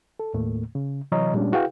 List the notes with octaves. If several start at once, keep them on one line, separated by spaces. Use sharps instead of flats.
A4
D#2 A2 A3 A#3
C#3
C3 E3 F#3 C#5 D#5 A#5
A#2 G3 G#3 C#4 D4
E4 F#4 G#4 B4 F5 G5